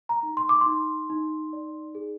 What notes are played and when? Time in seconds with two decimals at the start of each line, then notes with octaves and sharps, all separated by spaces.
0.09 A#5
0.23 D#4
0.37 C6
0.49 D6
0.61 D#4 C6
1.10 D#4
1.53 D5
1.95 G#4